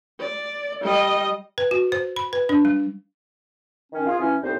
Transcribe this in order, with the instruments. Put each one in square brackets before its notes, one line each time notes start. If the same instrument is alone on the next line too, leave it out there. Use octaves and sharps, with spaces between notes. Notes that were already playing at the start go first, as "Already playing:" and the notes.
[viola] D5
G3 D#5
[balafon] B4
F#4
C5
B5
B4
D4
G3
[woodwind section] D#3 C#4
F4 G#4
E3 C#4
C2 A2 G3 B3 D#4 C5